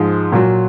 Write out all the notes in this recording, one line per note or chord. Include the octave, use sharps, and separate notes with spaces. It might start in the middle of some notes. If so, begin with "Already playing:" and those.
Already playing: G#2 F3 G#3
A#2 F#3